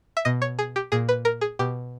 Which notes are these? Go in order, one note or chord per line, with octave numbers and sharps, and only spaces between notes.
E5
B2 D#5
C#5
G#4
G4
A#2 G#4
B4
A#4
G#4
B2 G4